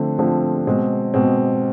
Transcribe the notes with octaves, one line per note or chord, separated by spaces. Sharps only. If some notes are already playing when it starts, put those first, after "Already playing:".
Already playing: D3 F3 A3 C4
D3 F3 A3 C4
B2 G#3 C4
B2 G#3 C4